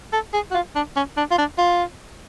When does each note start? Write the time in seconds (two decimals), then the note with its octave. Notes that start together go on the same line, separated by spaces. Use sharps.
0.13 A4
0.33 G#4
0.51 F#4
0.54 F4
0.75 D4
0.96 C#4
1.17 D4
1.31 F4
1.38 D4
1.58 F4